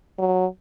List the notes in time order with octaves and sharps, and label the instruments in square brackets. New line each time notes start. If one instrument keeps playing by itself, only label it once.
[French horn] F#3